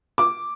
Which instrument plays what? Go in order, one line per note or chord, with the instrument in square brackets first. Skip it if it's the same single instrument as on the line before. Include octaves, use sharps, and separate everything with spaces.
[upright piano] D6